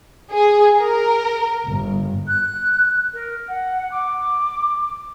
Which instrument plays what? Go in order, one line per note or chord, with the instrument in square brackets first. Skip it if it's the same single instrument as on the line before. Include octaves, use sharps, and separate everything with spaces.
[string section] G#4
A#4
G1
[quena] F#6
A#4
F#5
D6